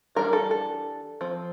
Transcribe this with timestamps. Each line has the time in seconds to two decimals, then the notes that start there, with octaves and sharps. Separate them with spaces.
0.15 E3 G3 D4 A#4
0.33 A4
0.51 A4
1.21 F3 C4